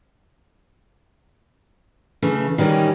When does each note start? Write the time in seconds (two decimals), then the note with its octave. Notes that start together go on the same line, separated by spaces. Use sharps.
2.22 C#3 E3 A3
2.58 D#3 E3 G3 C#4